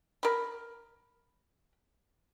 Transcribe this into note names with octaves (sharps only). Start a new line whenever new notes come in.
A#4 B5